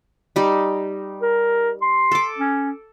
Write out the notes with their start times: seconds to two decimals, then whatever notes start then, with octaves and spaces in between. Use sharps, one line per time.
0.36 G3 D#4
1.22 A#4
1.82 C6
2.11 A4 D6
2.38 C#4